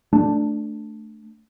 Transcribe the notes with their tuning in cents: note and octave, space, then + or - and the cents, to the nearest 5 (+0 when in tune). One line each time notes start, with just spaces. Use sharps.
A3 +0 D4 +0